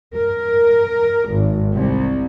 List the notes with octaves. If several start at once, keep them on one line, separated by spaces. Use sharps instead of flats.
A#4
G#1
C2